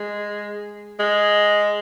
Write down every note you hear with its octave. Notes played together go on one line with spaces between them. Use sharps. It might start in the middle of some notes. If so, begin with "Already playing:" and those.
Already playing: G#3
G#3